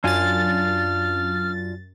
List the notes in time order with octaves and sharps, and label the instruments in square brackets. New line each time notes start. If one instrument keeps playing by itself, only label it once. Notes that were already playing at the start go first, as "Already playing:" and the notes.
[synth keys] F#2 A6 [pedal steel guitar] D4 F4 G#5 [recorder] F6